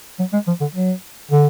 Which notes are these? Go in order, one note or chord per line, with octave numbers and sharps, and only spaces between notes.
F#3
G#3
F3
D3
F#3
D3